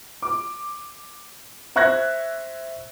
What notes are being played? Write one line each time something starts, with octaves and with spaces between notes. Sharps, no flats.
D6
C5 E5 C#6 F#6 G#6 A#6